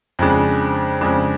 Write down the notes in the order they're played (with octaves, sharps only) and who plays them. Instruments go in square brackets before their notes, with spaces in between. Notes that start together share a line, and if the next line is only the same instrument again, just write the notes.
[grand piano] F2 C#3 G#3 D4
F2 C#3 G#3 D4